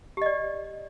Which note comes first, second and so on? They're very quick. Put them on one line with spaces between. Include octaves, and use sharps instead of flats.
G4 D#5 D5